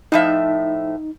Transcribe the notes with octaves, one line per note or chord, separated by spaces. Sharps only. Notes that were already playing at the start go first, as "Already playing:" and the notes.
A2 F3 D#4 E5